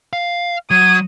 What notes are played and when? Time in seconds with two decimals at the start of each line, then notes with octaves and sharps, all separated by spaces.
0.13 F5
0.71 F#3 D#6 G#6